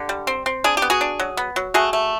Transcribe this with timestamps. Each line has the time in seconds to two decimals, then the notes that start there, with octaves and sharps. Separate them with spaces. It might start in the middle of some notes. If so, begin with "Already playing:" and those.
Already playing: D3 G4
0.09 G3
0.27 C4
0.46 C4
0.64 D4 G#4
0.77 G4
0.82 B3
0.90 F#4 G#4
1.01 D4
1.20 F#3
1.37 B3
1.56 F#3
1.74 A3 F#4 G#4
1.93 A3